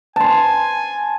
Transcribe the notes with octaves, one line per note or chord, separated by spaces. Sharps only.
G#5 A5 C6